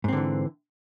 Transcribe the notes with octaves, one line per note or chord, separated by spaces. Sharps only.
G#2 D3 E3 C4